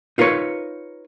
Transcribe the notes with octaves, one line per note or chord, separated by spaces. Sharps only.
D#4 F4 A#4 B4 C#5